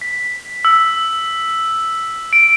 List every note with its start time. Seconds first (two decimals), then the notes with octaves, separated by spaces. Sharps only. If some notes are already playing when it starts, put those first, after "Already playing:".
0.01 B6
0.65 E6
2.33 D7